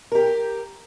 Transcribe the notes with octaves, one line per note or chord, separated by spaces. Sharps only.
G4 A#4